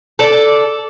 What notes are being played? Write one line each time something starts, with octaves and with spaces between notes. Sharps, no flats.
A4 D5